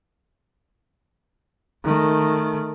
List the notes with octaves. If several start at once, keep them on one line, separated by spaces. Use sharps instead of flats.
D#3 A3